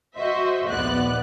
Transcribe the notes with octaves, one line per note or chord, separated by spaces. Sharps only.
F#4 C5 D#5 E5
A#1 D#2 B3 D5 F#6